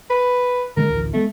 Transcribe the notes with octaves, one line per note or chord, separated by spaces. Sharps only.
B4
D3 G#3 C#4 A#4
A1 D2
G#3 A3 B3